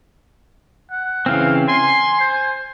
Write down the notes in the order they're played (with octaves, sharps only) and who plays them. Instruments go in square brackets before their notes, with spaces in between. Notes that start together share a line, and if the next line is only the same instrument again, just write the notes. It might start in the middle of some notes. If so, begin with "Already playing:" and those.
[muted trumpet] F#5
[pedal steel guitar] C#3 E3 C4 [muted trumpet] F5
[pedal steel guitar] G#5 [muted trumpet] C6
[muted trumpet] C5